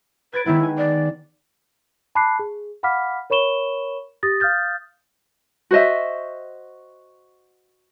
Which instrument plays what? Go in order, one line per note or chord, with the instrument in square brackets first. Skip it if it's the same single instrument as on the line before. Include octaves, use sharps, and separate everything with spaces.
[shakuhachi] B4 [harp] G#6 A6 D7
[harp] D#3 G#3 B3 [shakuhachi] E4
[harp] G#5
[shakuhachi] D5
[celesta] A5 B5 D6 F#6 C7
G#4
F5 F#5 B5 D6 F6 B6
A#4 C#5 B5 C#6 E7 G7
G4 D#6 A6 A#6
F5 D#6 F6 G6 A6
[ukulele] F#4 C5 D#5 E5